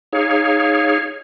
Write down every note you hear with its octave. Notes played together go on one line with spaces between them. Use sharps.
D#4 G#4 C#5 F5